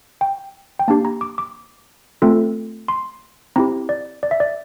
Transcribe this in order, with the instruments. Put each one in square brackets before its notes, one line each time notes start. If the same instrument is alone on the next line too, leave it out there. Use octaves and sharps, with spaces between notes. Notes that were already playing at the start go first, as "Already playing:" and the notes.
[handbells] G5
G5
A#3 D4 G4 A5
A#5
D6
D6
A3 C4 F4 A4
C6
C4 E4 G4 A#5
D5
D5
E5
D5